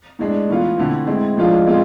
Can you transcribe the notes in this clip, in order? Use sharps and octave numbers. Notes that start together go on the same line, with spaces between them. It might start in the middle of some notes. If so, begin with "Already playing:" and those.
A2 G#3 D4
A2 E3 B3 F4
D3 A3 C4 E4
A2 G#3 C4 E4
A2 F3 G#3 D4 F4
B2 G#3 C4 F4